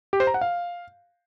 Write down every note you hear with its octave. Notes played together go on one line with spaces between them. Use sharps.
G4
C5
A#5
F#5
F5